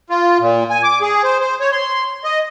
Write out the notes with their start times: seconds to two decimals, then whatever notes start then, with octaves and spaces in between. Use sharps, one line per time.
0.10 F4
0.40 A#2
0.70 G#5
0.83 D6
1.02 G#4
1.24 C5
1.40 C5
1.60 C#5
1.72 C6
2.24 D#5